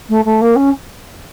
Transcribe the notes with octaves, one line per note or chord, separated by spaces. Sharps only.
A3
A3
A#3
C#4